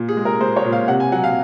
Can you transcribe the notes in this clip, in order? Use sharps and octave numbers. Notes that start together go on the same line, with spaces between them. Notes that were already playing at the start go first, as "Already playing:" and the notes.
Already playing: A#2
G#4
G#3
A#4
G#3 C5
C#5
A#2
F5
C3 F#5
G#5
F#3 F#5
F5